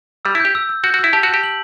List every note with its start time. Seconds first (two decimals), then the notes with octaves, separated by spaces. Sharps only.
0.25 G3 E6
0.35 E4
0.40 G4 G6
0.55 E6
0.69 E6
0.83 F#4 G6
0.94 F#4
0.99 E4 E6
1.13 G4 A5
1.23 F#4
1.28 G6
1.34 G4
1.43 F#7